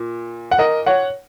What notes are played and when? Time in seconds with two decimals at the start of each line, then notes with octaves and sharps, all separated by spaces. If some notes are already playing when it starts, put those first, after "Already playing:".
Already playing: A#2
0.51 F#5
0.58 A#4 D#5
0.86 C#5 F#5